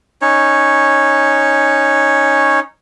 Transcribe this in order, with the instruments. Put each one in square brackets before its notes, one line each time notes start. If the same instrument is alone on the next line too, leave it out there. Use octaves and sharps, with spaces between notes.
[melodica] C#4 D#4 C#5